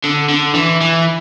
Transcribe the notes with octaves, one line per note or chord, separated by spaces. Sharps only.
D3
D3
E3
E3